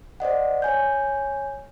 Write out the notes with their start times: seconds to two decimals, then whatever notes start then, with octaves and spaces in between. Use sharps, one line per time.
0.20 C5 D5 D#5 F#5
0.62 C#5 G#5 G6